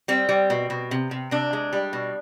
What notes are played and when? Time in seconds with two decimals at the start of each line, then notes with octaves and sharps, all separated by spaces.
0.08 G3 C4
0.29 G3
0.50 B2
0.70 B2
0.91 C3
1.11 C3
1.31 C3 D4
1.53 G#3
1.73 G3
1.93 B2